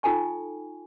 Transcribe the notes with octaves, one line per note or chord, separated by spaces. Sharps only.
D#4 F4 A4 G5 G#5 C#6